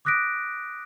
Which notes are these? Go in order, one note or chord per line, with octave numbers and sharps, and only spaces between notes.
D6 D#6 F#6 A#6 B6 D7